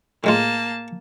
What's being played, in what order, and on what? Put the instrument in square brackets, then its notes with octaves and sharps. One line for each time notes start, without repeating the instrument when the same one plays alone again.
[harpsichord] A2 G#3 F4 [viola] A#3 A5